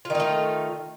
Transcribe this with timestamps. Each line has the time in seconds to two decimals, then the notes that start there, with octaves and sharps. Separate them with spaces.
0.05 F4
0.10 D#3
0.15 D#4
0.20 A3